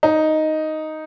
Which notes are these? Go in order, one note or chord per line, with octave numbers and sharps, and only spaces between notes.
D#4